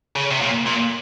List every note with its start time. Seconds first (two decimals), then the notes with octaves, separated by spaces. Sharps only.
0.16 C#3
0.31 C3
0.41 A#2
0.66 A#2